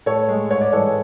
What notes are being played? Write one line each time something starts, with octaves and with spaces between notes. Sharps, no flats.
A2 A4 C#5
G#3
G#2 C#5
D5
E3 G#3 A4 C#5